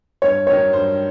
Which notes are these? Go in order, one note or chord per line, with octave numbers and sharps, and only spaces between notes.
G2 C#5
D#3 F#3 C#5
G2 C5